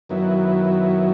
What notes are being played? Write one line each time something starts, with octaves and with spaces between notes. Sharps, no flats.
F#2 D#3 F#3 B3 E4